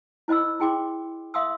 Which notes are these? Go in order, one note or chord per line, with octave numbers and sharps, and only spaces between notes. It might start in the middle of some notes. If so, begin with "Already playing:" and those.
E4 C5 D#5 B5 E6
E4 G#4 G5 C6 D6
E5 F5 C6 D#6 E6